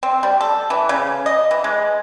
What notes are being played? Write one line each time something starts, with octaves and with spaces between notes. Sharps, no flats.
C4
G3
A4
E3
C#3
D#5
E3
G#3